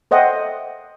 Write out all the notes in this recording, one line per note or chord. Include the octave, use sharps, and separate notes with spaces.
A4 C5 D#5 E5 F#5 G5